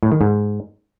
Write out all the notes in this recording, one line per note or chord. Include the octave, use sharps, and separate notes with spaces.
A2
D#3
G#2